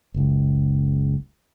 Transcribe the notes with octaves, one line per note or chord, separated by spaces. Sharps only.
F#1 C#2